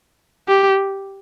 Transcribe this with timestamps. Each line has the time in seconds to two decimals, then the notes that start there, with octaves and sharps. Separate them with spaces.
0.48 G4